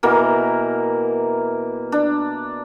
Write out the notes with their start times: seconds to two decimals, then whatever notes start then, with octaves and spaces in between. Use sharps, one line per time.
0.03 B2 E3 A#3 A#4
1.92 D4